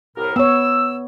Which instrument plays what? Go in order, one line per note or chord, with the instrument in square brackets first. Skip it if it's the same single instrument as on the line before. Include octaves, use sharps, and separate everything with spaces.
[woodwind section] C2 A2 A#4
[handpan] B3 C#5 [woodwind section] E6